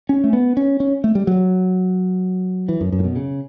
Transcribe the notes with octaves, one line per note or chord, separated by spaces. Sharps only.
C#4
A3
B3
C#4
C#4
A3
G3
F#3
E3
F#2
F#2
A2
B2
C#3